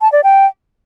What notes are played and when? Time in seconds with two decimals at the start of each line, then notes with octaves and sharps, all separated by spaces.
0.01 A5
0.12 D5
0.24 G5